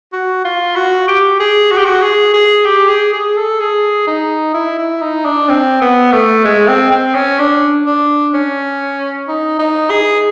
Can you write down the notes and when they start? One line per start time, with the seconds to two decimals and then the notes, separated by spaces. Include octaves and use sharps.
0.13 F#4
0.45 F4
0.76 F#4
1.08 G4
1.40 G#4
1.71 F#4
1.78 G4
1.85 F#4
2.02 G#4
2.34 G#4
2.65 G4
2.89 G#4
3.13 G#4
3.37 A4
3.60 G#4
4.07 D#4
4.54 E4
4.78 E4
5.02 D#4
5.25 D4
5.49 C4
5.81 B3
6.12 A3
6.44 G#3
6.68 C4
6.91 C4
7.15 C#4
7.39 D4
7.86 D4
8.34 C#4
9.28 D#4
9.59 D#4
9.90 G#4